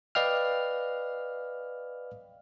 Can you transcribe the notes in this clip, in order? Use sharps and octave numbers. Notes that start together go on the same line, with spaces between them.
B4 D5 D#5 F5 G5 F6